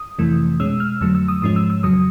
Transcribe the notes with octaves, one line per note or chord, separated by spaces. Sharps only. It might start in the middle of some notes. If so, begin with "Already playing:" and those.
Already playing: D#6
F2 C3 E3 A3
B2 G#3 C#4 E6
F6
F2 D3 F#3 A3 E6
E6
D#6
G#2 F3 G#3 C#4 D#6
E6
E6
F2 C#3 F#3 D#6